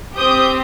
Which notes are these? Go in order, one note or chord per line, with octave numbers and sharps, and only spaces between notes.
C4 G4 D#6 G6